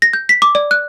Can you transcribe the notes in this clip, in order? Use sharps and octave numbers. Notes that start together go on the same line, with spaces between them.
A#6
G6
B6
D6
D5
F#6